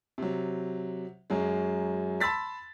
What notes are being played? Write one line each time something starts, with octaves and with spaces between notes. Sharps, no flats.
C3 F#3
F#2 F#3 G#3
A5 B5 C6 E6 A6 B6